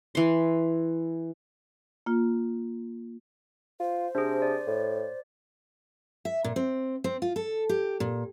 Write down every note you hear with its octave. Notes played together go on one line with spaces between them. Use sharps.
E3 C6
A#3 F4
F4 C5
C3 D4 G#4
D5
A2
E5
A#2
C4
C4
F4
A4
G4
A#2